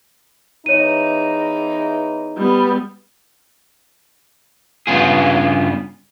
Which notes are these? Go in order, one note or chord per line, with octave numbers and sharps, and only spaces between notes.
E2 E3 D#4 C#5 D#7
G3 B3
G2 C#3 B3 F4 G#4